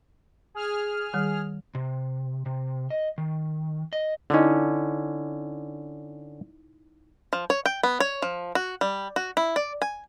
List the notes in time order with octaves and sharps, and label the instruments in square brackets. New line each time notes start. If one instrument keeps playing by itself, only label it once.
[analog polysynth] G#4 F6
[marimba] D#3 G3
[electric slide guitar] C3
C3
D#5
D#3
D#5
[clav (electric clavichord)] D3 C#4 [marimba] D#4 E4 D#5
[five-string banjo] F3
C#5
G5
B3
C#5
F3
F#4
G3
F#4
E4
D5
G#5